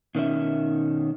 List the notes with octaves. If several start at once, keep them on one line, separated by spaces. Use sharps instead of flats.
B2 D#3 C#4 E5